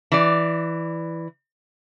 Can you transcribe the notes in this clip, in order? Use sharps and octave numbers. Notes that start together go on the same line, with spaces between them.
E3 D5